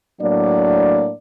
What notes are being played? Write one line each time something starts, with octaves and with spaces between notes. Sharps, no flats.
A2 F#3 A#3 D4 D5